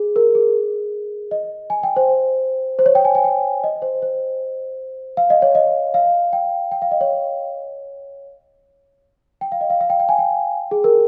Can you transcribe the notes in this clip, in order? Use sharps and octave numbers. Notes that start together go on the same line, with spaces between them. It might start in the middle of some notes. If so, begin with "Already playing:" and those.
Already playing: G#4
A#4
G#4
D#5
G#5
G5
C5
C5
C#5
G5
G#5
G#5
G5
D#5
C5
C5
F5
D#5
C#5
D#5
F5
G5
G5
F5
D#5
C#5
G5
F5
D#5
F5
F5
G5
G5
G#5
G5
G#4
A#4